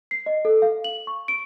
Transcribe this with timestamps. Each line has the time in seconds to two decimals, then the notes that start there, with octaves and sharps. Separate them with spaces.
0.11 C7
0.26 D#5
0.45 A4
0.62 F5
0.84 F#7
1.07 C#6
1.28 D7